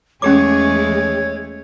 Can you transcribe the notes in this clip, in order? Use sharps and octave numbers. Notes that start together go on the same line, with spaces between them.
E2 G#3 A3 C#4 G4 G#4 C#5 D6